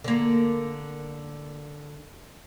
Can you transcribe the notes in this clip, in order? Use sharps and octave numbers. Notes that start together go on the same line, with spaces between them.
D3 A#3